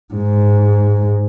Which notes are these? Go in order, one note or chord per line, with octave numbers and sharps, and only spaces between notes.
G#2